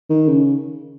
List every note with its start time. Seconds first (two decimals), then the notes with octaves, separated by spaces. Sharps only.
0.10 D#3
0.28 C#3